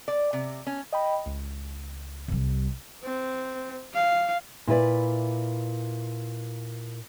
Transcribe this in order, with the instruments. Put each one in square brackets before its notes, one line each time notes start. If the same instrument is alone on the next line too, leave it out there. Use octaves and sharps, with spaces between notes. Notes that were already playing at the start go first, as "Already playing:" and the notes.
[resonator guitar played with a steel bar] D5
C3
C#4
[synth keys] D#5 G5 B5
C#2
[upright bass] C2 G3
[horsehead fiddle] C4
F5
[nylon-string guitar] A#2 E4 B4 D5